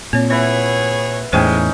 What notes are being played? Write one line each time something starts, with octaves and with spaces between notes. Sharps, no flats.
A#2 C4 C#5
A#3 E4 G#4 B4 C#5 F#5
E2 A2 G#3 C#4 D#4 C5 G5 G#5